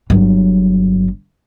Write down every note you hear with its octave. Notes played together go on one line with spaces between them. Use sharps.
G1 F#3